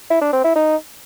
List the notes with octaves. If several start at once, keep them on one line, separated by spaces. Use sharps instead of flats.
E4
D4
C4
E4
D#4